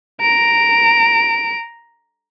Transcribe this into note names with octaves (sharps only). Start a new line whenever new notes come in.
A#5 D7